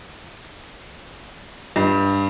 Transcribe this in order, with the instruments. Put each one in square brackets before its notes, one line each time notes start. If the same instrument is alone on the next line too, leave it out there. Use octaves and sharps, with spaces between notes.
[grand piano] G2